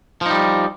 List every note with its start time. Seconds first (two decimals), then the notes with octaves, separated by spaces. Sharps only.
0.21 F3
0.26 D#4
0.30 G3